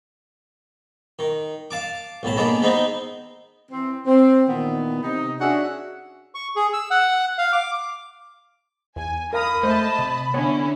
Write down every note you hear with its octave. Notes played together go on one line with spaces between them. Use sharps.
D#3
F5 A5 D6
B1 A2 A5
G#3 A#3 B3 D4
G#3 B3 C4 D#4
E3 C4
C4
A#2 D#3 E3 B3
C3 D#4
C#4 D4 F#4 G#4 E5 F#5
C#6
G#4
E6
F#5
F5
D6
E2 G#5
A#4 F5 A#5 B5 D#6
A3 C5 D#5 E5 A5
C3
D3 B3 C#4 E4 C#5